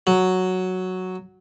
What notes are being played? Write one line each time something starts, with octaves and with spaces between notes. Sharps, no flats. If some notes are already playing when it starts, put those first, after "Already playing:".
F#3